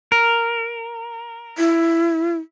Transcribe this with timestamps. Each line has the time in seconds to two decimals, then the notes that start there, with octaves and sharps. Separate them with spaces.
0.12 A#4
1.58 E4